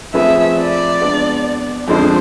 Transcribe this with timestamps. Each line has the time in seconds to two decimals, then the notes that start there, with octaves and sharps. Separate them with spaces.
0.14 F3 A3 C4 G#4 B4 E5
0.58 D5
1.01 G#3 B3 D4
1.88 F2 D3 F3 G#3 D4 C5